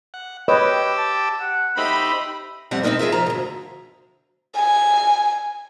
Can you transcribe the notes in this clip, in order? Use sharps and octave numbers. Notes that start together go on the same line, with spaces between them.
F#5
G4 B4 C#5 D#5 G5 D6 E6
A5
F#5
D#4 G4 C5 E5 B5
F2 G3 A3 C4 D5 F#5
G#3 C4 C#4 D#4 E4 A#4
F4 G#4 A#4 E5
F3 A#5
D2 G#2
G#5